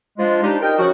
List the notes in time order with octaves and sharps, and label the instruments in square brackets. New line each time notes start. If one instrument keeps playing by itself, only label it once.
[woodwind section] F3 G#3 D4 F4
G3 D4 D#4 G4
D#4 A#4 G5
C#3 F3 F#4